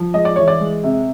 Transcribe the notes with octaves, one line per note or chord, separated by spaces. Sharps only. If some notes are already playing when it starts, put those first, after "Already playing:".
Already playing: F3
G#3 D#5
D5
E3 C#5
D5
G#3
C3